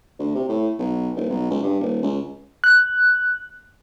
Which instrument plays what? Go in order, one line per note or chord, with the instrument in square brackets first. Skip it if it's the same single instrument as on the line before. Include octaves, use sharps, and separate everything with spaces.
[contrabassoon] D2
C3
A2
B1
D#1
B1
C#2
G2
D#1
C#2
[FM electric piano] F#6